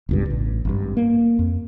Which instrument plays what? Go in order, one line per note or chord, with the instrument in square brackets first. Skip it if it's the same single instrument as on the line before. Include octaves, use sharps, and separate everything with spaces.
[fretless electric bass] E1 C#2 G2
A1
G#1 G2
A#3
F2